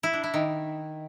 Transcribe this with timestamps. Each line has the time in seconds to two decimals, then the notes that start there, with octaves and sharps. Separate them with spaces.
0.03 E4
0.13 D4
0.24 E4
0.34 D#3